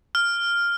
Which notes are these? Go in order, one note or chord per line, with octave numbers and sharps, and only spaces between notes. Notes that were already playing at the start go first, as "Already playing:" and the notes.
F6